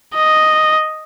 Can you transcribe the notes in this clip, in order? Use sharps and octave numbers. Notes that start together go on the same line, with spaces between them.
D#5